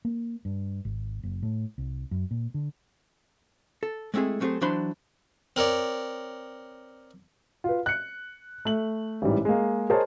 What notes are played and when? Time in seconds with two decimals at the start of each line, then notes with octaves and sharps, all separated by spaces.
0.05 A#3
0.45 G2
0.85 G#1
1.23 F#1
1.43 A2
1.78 C2
2.11 F#2
2.31 A#2
2.54 D3
3.83 A4
4.14 G#3 A3 C4 E4 G#4
4.40 F#3 A3 C4 F4 G4 G#4
4.61 E3 F#3 D4 C5 B5 C6
5.56 C4 A#4 C#5 D5
7.64 F4 B4
7.86 F#6 C#7
8.65 A3 F#7
9.22 A1 G#2 E3 G3
9.45 G#3 A#3
9.90 G#4 A#4 C5 C#5 D#5 A5